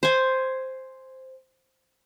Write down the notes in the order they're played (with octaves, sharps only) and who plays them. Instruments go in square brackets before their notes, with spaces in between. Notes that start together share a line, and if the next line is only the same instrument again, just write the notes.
[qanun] C5 G#5